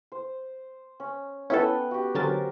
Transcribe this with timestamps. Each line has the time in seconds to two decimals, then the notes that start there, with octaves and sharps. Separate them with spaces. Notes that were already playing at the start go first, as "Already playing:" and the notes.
0.12 C5
1.00 C#4
1.50 B3 C#4 E4 A4 G5
1.91 F#4 G4
2.15 D3 F#3 C#4 A#4 C5 A6